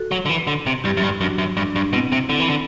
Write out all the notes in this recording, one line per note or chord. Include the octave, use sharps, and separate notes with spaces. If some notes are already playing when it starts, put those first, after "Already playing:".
Already playing: F#4 A4
F#3
D3
E3
D3
C3
G2 E4 G4
F#2
G2
F#2 D4 F#4
F#2
G2 D4
G2 D4
B2 C4 E4
C3
D3 C4 E4
E3
D3